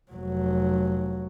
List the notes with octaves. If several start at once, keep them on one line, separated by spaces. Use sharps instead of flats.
F1 F#3